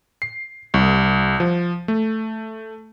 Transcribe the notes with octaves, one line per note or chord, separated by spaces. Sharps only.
C7
C2
F3
A3